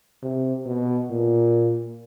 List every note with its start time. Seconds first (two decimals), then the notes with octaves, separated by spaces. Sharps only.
0.23 C3
0.66 B2
1.10 A#2